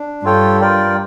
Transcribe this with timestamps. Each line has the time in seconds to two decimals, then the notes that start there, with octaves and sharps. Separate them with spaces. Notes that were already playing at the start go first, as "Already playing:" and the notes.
Already playing: D4
0.24 G2 F4 A4 C#5 G5
0.61 F4 A#4 D5 G5